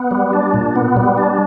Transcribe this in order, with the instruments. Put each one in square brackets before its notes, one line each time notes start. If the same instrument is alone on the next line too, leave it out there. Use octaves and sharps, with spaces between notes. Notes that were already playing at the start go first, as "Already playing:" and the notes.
Already playing: [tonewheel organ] B3
G3
D4
A#2
B3
G3
D4